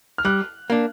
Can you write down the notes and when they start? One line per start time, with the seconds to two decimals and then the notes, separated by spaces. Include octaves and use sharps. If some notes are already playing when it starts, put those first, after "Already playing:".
0.18 F6
0.25 G3 F#6
0.70 A#3 D4